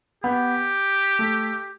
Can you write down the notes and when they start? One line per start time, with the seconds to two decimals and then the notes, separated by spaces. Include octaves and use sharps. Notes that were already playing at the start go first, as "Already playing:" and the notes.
0.23 B3 G4
1.19 A3